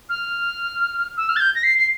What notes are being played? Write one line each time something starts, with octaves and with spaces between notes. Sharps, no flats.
F6
E6
F6
A6
G6
A#6
C7
C7